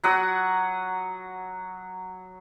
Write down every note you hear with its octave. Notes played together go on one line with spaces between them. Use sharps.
F#3 F#5 D#6